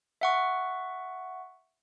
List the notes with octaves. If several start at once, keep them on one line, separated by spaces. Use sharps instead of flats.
E5 F#5 C#6